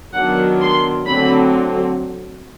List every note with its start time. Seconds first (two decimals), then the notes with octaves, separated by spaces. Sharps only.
0.13 D#3 F#3 B3 D4 F#5
0.60 C6
1.06 D3 F#3 A3 C4 B5